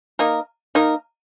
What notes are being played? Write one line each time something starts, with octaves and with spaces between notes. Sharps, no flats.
A#3 D#4 A#4
A#3 D#4 A#4